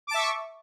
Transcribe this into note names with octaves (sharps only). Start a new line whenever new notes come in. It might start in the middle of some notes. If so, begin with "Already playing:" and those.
E5 A5 C#6 D6